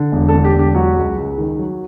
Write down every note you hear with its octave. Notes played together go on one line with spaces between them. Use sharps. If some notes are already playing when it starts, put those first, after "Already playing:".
Already playing: D3
E1
A4
D3
G4
E1 G4
F#3 F#4
C#2
C#2
D#3
F#3